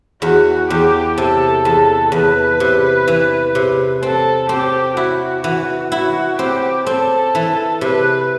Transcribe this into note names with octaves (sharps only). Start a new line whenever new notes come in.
E2 F#4
E2 G4
C3 A4
E2
E2 B4
C3
E3
C3
C4 A4
C4 G4
E4 F#4
E3
E4 F#4
C4 G4
C4 A4
E3
C3 B4